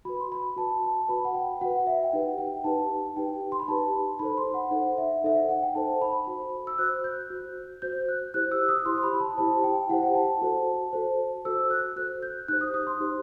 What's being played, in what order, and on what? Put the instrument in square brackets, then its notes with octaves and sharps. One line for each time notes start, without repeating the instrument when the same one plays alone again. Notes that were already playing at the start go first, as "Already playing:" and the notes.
[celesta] F#4 B4 B5
C6
B5
F#4 B4 A5
A5
F#4 B4 B5
F#5
G5
F#4 B4 F#5
E5
G5
D#4 G4 B4 F#5
G5
D#4 G4 B4 A5
D#4 G4 B4 G5
C6
B5
D#4 G4 B4 A5
D#4 A4 C5 B5
C6
F#5
D#4 A4 C5 F#5
E5
D#4 A4 C5 E5
F#5
F#5
G5
D#4 A4 C5 A5
B5
F#4 C5
E6
F#4 C5 F#6
G6
F#4 C5
F#4 C5 G6
F#6
E4 G4 C5 F#6
E6
D#6
E4 G4 C5 C6
C6
B5
A5
E4 G4 C5 A5
G5
E4 G4 C5 F#5
G5
A5
F#4 A4 C5
F#4 A4 C5
F#4 A4 C5 E6
F#6
F#4 A4 C5 F#6
G6
D#4 G4 C5 F#6
D#6
D#6
C6
D#4 G4 C5